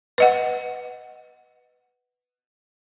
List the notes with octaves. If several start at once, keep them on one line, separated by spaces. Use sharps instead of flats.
B4 D#5 F#5